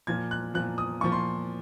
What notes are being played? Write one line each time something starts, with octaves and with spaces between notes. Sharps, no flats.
A#2 F3 G#6
F#6
A#2 F3 F#6
D#6
A#2 F3 C#6
C6